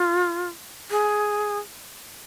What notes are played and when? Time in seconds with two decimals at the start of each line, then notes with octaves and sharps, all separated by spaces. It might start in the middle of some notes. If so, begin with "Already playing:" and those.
Already playing: F4
0.91 G#4